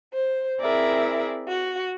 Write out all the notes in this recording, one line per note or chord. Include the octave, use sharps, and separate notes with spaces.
C5
C4 E4 G#4 A#4 D5 E5
F#4